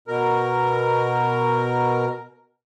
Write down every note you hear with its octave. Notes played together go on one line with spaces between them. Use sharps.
B2 A#4